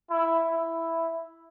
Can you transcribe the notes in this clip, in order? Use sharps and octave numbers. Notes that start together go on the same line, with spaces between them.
E4
E4